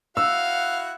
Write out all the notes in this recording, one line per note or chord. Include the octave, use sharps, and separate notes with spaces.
E4 F#4 F5 F#5 E6